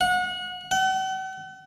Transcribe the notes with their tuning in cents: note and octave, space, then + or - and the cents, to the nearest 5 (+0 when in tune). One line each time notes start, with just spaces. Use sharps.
F#5 -30
F#5 +45